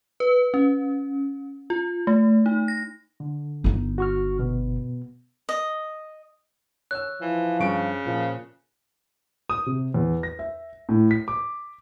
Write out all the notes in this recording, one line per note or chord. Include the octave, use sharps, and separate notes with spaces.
B4
C#4
F4
A3
D#4
A#6
D3
G1 D#4
F#4 C#6 F6
B2 B3
D#5
C#5 E6 F#6
E3 F3
G2 C#3 C#6 D7
A#2 F3
D#6
C3
E2
A#6
E5
A2
B6
D6